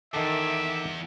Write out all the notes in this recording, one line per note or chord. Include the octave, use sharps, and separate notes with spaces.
E2 D#3 A4 E5 D6